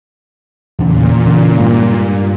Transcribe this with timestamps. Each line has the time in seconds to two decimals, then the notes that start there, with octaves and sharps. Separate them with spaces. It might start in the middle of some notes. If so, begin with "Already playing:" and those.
0.79 E2 A#2 C#3 E3
1.26 C#3 E3
1.58 G2 G3 G#3